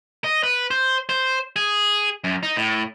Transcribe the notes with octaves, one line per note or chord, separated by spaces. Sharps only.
D#5
B4
C5
C5
G#4
F#2
D#4
A2